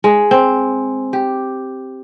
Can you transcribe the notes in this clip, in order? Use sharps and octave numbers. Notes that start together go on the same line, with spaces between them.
G#3
C4
G4